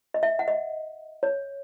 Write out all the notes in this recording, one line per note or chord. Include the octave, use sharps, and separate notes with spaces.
D#5
E5
F#5
D#5
C#5